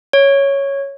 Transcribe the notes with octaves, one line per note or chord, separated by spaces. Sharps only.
C#5